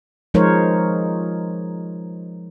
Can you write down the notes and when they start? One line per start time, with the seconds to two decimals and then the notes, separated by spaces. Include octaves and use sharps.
0.34 F3 G#3 D#4 A#4 C5 C#5